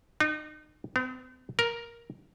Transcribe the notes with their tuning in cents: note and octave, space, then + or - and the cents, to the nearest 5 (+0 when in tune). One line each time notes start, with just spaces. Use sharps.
D#4 -35
C4 -45
A#4 +5